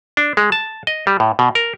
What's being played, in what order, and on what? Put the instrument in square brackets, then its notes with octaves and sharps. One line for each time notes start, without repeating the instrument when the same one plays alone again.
[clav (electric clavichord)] D4
G#3
A5
D#5
G3
A2
B2
A#4